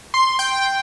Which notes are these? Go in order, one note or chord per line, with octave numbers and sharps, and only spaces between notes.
C6
G5